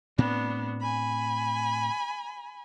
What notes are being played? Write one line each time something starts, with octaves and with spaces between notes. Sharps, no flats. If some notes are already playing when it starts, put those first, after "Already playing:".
A2 B3 C4 D4
G#5 B5